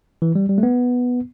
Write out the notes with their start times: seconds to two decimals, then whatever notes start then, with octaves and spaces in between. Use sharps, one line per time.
0.22 E3
0.35 G3
0.49 G3
0.58 A3
0.63 B3